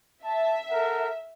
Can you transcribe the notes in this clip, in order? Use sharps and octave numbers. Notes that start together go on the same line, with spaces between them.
E5 A5
A4 A#4 F#5